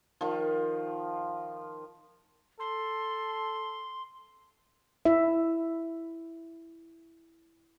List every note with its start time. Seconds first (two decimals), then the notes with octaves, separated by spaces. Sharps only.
0.21 D#3 F3
2.60 A4 C6
5.05 E4 E5